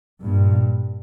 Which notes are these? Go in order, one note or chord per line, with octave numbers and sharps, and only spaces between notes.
G2 A#2